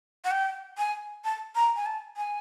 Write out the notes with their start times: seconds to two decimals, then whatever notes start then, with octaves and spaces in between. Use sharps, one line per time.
0.24 F#5
0.31 G5
0.78 G#5
1.24 A5
1.55 A#5
1.76 G#5
1.86 A5
2.17 G#5